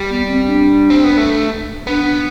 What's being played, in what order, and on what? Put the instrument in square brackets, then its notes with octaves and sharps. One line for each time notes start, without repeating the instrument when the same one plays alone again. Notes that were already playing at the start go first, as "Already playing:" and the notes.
Already playing: [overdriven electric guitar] G3
[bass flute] B3
C4
D4
[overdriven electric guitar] C4
B3
A3
[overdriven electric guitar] B3 [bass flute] D4
[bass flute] D4